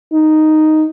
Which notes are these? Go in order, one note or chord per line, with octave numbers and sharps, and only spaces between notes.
D#4